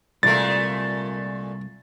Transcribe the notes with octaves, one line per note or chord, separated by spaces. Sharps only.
C2 A#2 G#3 A3 A6